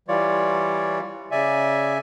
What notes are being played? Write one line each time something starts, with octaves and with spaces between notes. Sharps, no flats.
E3 G3 F4 C#5 D5
C#3 D5 E5 G#5